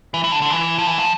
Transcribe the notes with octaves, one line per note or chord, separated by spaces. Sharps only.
E3
E3
D3
D3
E3
F3
E3
F3